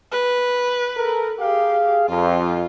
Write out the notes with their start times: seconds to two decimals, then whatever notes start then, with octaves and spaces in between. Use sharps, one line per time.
0.12 B4
0.97 A4 A#4
1.40 G4 G#4 F5
2.09 F2 F4